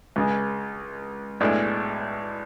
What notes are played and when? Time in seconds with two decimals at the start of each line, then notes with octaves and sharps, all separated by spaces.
0.16 C#2 C#3 G#3
1.40 B1 A2 G#3 D4 A4